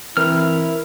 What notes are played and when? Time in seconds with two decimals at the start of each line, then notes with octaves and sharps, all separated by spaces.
0.17 E3 C4 E4 A#4 F6